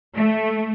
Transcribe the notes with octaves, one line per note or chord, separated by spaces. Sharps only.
A3